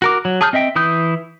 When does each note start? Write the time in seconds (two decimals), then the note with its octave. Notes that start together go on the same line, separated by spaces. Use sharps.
0.02 F#4 A#4 D6
0.25 F#3
0.41 G#4 A5 D#6 F6 G6
0.53 C4 D#5 E5 G5
0.76 E3 E4 D#6 G6